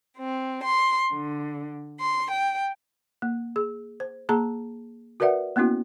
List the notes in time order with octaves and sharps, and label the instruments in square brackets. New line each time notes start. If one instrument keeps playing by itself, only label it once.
[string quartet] C4
C6
D3
C6
G5
[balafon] A#3
G#4
C5
A#3 G#4 A5 A#5
F#4 A#4 B4 D5 E5 F#5
A#3 B3 C#4 E4 F#4